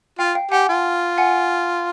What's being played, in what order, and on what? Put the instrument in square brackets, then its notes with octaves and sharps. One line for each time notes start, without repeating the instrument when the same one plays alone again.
[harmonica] F4 [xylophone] F5 G5
[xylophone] F5 G5
[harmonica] G4 [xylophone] F#5 G#5
[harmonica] F4
[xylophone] F#5 G#5